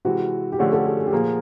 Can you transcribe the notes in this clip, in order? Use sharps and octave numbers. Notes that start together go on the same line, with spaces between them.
C3 E3 G#3 F#4
G4
D3 F3 A3 C#4 F#4 G#4
A4
G#4
G#4
G4
A#2 F3 A#3 G#4